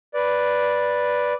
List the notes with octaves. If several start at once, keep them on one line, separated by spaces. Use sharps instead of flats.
B4 D5